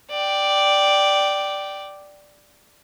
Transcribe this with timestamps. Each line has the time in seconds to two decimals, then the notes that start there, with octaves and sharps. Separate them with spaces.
0.11 D5 G5